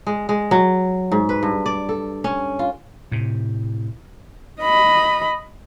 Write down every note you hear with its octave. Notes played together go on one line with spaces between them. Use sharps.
G#3
G#3
F#3
G#2
B4
G2
D5
A4
C#4
F4
A2 C3
D#5 B5